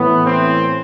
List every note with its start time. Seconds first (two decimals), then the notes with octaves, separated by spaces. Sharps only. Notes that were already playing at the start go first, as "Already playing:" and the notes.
Already playing: A2 E3 B3
0.25 C4